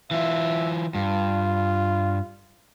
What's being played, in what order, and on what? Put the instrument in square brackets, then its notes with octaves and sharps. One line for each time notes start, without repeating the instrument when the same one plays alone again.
[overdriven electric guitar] E3 F4 [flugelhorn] E5
[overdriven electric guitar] G2 [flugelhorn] F4